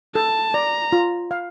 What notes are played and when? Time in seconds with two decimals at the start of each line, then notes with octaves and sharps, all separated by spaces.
0.15 A4 A5
0.54 D5 A#5
0.92 F4
1.31 F5